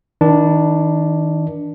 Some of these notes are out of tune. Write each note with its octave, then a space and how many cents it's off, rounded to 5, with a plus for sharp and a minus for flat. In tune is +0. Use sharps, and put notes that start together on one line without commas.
D#3 +35 D4 +0